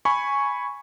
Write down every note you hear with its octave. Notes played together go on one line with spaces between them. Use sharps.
G#5 B5 C#6